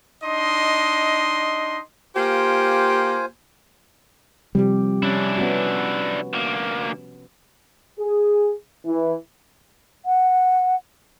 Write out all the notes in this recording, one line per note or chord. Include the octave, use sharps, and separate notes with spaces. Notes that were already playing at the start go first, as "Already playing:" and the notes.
D4 D#4 D#5 C6
A#3 F4 G4 C5 G#5
C3 F3 G3 G4
C#4 D4 E4
B3 C#4 F#4
D2 A#3
G#4
E3
F#5